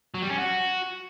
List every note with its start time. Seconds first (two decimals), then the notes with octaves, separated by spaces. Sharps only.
0.14 F#3
0.22 G3
0.30 C#4
0.38 F#4